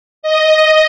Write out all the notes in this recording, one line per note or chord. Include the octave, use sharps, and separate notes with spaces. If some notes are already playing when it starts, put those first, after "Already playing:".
D#5